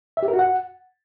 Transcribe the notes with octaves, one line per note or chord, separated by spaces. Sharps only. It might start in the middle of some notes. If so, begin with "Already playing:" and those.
E5
G4
A#4
F#4
F#5